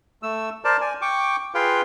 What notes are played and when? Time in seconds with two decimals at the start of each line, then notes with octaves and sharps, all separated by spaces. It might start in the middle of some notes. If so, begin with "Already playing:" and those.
0.23 A3 E6
0.64 A#4 C5 D5 A5
0.81 D5 G#5
1.02 G5 C#6 D6
1.55 F4 G#4 B4 F5 G5 C6